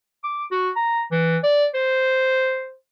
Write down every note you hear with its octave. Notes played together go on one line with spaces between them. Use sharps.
D6
F#4
A#5
E3
D5
C5